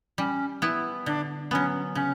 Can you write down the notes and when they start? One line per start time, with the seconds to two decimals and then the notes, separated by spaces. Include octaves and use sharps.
0.18 G3 C#4
0.62 B3 E4
1.06 D3 D4
1.51 F#3 B3 C#4
1.95 C#3 C#4